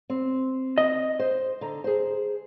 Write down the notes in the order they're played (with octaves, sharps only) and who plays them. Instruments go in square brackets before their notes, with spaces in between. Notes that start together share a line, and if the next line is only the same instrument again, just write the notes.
[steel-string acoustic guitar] C4
[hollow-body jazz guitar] D#5
[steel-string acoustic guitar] C5
D3 A#5
G#4 C5